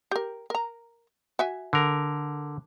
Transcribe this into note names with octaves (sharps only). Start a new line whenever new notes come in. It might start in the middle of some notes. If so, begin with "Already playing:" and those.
G4 A#4
A#4 A#5
F#4 E5 G#5
D3 A#4